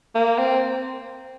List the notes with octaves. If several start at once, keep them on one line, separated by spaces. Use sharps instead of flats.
A#3
C4